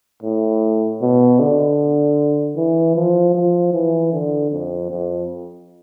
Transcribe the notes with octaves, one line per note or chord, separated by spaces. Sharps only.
A2
B2
D3
E3
F3
F3
E3
D3
F2
F2